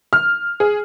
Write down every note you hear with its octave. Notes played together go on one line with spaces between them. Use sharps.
F6
G#4